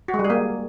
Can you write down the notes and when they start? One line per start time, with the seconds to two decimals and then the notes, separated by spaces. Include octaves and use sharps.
0.08 F#4
0.14 G#3
0.19 G3
0.25 G#4
0.30 A#3